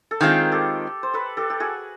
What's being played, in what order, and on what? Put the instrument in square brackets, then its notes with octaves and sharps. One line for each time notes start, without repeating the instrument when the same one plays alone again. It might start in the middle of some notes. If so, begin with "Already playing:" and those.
[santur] A4
[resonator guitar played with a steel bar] D#3 G#3 C4 F4 [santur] G#4 A#4
[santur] G4 A4
C5
A4 B4
G4 A4
G4
F#4 G#4